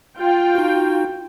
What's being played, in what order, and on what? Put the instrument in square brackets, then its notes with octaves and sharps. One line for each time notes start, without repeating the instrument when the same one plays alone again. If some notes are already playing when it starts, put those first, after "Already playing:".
[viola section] F4 G5
[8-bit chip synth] D#4 F#4